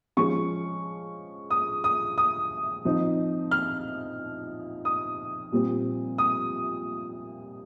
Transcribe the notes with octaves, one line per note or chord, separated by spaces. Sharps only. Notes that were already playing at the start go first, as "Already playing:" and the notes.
F3 G#3 C#4 C#6
D#6
D#6
D#6
F3 C4 D#4
F6
D#6
A#2 G3 C4
D#6